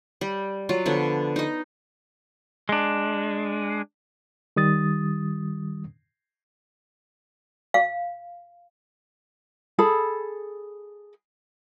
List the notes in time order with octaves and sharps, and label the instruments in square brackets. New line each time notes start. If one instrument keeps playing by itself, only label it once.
[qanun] G3
F#3 F4
D3 F3 B3
D#4 D#5
[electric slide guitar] G#3 D4
[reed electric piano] D#3 G3 D#6 A6
[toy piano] F5
[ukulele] G#4 A4 B5